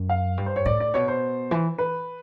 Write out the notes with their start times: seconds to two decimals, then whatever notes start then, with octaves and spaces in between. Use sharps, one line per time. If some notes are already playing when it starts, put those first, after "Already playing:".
Already playing: F#2
0.09 F5
0.37 G2
0.46 C5
0.56 C#5
0.65 A2 D5
0.80 D5
0.94 B2 C#5
1.08 C5
1.51 E3
1.78 B4